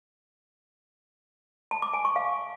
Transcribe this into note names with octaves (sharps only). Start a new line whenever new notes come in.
A5
D6
G#5
C#6
F5